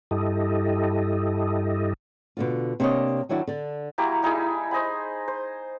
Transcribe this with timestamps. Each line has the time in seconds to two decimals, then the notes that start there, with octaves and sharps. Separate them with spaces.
0.11 G2 E4 G4 A4 D#5
2.37 B2 D3 F4
2.80 C3 A#3 D4 B4 C#5 D#5
3.29 D#3 F#3 D4 E4 F#4
3.47 D3 D4
3.98 F#3 A#3 E4 G4
4.23 G3 D#4 E4 G#4
4.71 C5 D#5 G#5 B5
5.28 C5